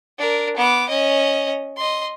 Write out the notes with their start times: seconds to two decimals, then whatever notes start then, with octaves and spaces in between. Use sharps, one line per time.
0.19 D4 A#4
0.57 B3 D6
0.89 C#4 D#5
1.77 D#5 C6